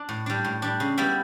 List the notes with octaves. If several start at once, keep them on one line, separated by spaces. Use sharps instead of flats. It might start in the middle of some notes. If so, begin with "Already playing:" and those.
Already playing: D4
A2
G3 D4
A2
G3 D4
C#3
G3 B3 E4